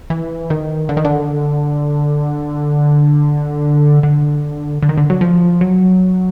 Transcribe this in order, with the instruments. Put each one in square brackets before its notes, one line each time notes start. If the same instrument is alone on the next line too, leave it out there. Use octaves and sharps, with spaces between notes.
[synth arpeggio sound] E3
D#3
D3
D#3
D3
D3
D3
D#3
D3
F#3
F3
F#3